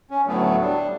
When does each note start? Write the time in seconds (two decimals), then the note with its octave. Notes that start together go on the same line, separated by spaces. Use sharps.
0.10 C#4
0.27 D2 A2 F#3 A3 B3
0.61 G3 D4